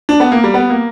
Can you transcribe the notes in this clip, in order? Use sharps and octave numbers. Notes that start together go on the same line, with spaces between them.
D4
B3
A#3
G3
B3
A#3